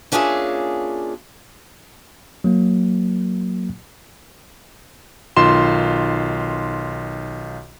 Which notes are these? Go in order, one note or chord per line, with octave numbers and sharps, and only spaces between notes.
A#3 C#4 D4 F4 G#4 E5
F#3 A#3
B1 D#3 F4 C6 E7